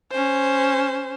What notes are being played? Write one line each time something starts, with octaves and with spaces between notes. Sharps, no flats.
C#4 C5